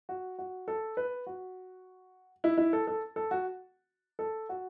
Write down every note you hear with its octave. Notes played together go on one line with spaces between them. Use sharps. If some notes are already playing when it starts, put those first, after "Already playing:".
F#4
F#4
A4
B4
F#4
E4
E4
A4
A4
A4
F#4
A4
F#4